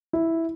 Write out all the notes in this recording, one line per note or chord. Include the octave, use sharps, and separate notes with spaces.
E4